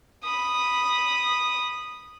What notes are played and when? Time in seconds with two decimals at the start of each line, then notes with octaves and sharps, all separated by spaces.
0.23 B5 D#6